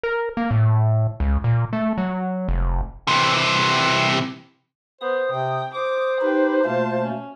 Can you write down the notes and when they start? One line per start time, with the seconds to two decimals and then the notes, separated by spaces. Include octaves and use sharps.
0.03 A#4
0.37 A#3
0.51 A2
1.20 C#2
1.44 A#2
1.73 A3
1.98 F#3
2.48 F1
3.08 C3 E3
5.01 B3 C5 D#6
5.32 C3 G5
5.75 C5 D6 D#6
6.21 D#4 G4 B4 G5
6.65 B2 A3 A#3 F4 A5
7.05 C#4